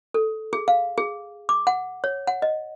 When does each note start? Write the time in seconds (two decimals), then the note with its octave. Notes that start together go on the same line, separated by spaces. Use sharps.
0.14 A4
0.53 G#4
0.68 F5
0.98 G#4
1.49 D6
1.67 F#5
2.04 C#5
2.27 F#5
2.42 D#5